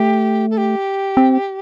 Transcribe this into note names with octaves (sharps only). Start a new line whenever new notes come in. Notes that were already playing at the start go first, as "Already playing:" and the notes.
Already playing: A3 G4
A4
G4
C4